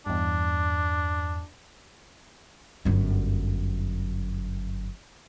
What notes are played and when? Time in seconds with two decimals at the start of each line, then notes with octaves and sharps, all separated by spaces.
0.06 E2 G2 D4
2.85 G1 F#2